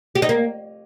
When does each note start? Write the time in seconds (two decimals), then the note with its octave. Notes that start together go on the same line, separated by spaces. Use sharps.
0.15 G4
0.22 D#4
0.29 A#3